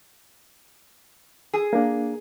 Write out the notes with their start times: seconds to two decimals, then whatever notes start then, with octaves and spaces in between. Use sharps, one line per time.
1.53 G#4
1.73 A#3 D4